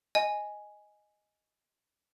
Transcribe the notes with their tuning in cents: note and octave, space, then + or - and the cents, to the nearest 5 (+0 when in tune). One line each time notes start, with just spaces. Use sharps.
D#5 +0 G#5 +0